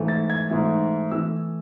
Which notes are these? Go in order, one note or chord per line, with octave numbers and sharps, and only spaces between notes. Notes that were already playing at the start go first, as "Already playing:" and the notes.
Already playing: G#2 E3 A3
A6
G#6
G#2 E3 A3
E3 A3 E6